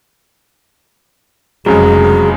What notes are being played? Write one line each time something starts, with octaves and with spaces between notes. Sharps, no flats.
F1 F2 C#3 F#3 G#3 G#4